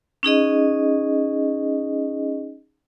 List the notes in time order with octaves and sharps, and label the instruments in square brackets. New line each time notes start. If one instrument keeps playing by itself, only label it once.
[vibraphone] C#4 D#4 G#4 D#5